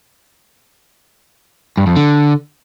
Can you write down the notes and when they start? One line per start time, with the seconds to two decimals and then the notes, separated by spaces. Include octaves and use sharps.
1.77 G2
1.87 F2
1.96 D3